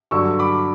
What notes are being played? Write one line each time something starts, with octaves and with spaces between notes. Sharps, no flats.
G2 D3 F#3 C#6 E6
B5 D6